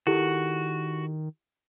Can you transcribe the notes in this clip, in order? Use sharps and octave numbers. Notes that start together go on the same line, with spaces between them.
D#3 E4 F#4 G4 A4